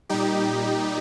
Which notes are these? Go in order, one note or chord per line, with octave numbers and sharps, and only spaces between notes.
A#2 G3 D#4 G4